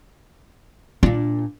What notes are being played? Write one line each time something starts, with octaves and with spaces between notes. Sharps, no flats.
A#2 D4 F4